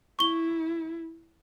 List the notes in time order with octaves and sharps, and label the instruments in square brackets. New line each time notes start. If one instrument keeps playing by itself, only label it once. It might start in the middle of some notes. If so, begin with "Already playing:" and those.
[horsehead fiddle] E4 [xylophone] C#6 G7